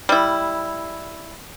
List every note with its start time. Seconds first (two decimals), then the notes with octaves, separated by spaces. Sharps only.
0.09 G3 E4